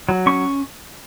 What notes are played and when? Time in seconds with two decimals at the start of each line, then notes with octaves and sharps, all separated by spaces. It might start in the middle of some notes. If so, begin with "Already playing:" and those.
0.09 F#3
0.26 C#4 C#6